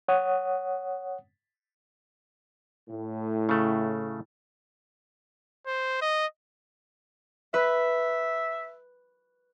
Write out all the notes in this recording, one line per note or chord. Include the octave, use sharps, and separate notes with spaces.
C#5 F#5 D#6
A2
C#3 A3
C5
D#5
B4 E5